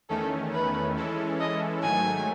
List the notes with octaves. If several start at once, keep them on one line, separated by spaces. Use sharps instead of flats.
E2 D#3 A3 C#4 A4
B4
E3 G#3 C#4 E4 A4
D#5
G#2 D#3 F#3 A3 G#5